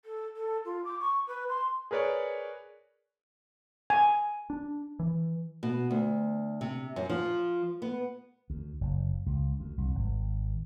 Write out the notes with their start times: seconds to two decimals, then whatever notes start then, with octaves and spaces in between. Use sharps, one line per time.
0.04 A4
0.36 A4
0.64 F4
0.84 D6
0.99 C#6
1.27 B4
1.48 C6
1.91 G#4 A#4 B4 C#5 D5
3.90 G#5
4.50 D4
4.99 E3
5.63 B2
5.91 D2
6.61 C3
6.96 F#2
7.10 F3
7.82 B3
8.50 D2
8.81 F#1
9.26 C#2
9.60 D2
9.78 C2
9.95 G#1